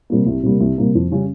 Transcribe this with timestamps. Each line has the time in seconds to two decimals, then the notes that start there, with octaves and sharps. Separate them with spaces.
0.10 C3 G3 A#3
0.26 C2
0.43 C3 G3 A#3
0.60 C2
0.78 C3 G3 A#3
0.95 F2
1.12 C#3 G3 C#4